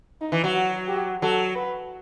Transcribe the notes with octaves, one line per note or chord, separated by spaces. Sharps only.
D#4
E3
F#3
F#4
G4
F#3 A4
B4